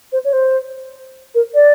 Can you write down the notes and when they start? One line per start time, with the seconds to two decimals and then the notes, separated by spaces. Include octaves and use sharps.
0.12 C5
0.25 C#5
0.33 C5
1.35 A#4
1.55 D5